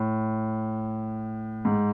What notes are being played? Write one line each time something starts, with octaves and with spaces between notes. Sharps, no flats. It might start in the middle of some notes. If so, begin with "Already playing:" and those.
Already playing: A2
G#2